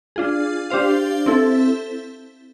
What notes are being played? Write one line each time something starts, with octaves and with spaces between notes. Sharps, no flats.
D4 F4 G#4
D4 G4 C5 F5
C4 E4 A4